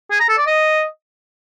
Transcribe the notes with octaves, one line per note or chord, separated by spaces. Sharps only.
G#4
A#5
A4
D5
D#5